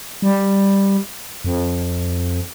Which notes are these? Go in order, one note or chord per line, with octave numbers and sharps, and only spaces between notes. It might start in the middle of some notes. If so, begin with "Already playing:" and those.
G3
F2